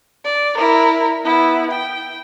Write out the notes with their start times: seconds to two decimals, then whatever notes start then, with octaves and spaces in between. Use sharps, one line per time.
0.25 D5
0.57 E4 A#4
1.24 B3 E4
1.71 G5